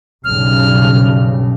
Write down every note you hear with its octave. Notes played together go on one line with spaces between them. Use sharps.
B1 G2 C#3 F6